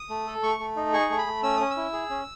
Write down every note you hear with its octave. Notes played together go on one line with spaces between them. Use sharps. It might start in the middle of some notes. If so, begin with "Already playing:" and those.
Already playing: D#6
A3
A4
A3 C#6
A3
D#4
G#4 C#6
A3
B5
A3
C#4 E6
C#4 D#6
E6
E4
G#4
C#4